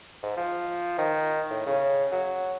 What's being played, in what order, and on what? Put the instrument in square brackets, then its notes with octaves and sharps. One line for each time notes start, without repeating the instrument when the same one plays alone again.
[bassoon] G#2
F3
D#3
A2
C#3
F#3